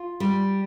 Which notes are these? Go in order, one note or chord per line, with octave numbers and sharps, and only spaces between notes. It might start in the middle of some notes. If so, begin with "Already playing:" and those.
Already playing: F4
G3